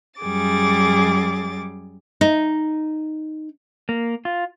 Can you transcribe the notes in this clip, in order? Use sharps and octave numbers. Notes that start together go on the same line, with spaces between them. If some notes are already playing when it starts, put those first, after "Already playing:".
F#2 G3 G#4 D6 A6
D#4
A#3
F4